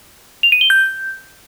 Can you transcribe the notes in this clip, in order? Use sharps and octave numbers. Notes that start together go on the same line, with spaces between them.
F7
D#7
G7
G6